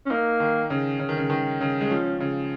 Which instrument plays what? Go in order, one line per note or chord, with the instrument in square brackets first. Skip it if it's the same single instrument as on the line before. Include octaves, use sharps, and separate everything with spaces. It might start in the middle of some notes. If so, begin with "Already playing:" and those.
[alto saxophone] C#4
[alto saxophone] A#3 [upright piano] D#4
[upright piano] D#3
C#3
C#3
D#3
C#3
D#3
C#3
G#3
[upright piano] F3 [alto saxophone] C#4
[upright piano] C#3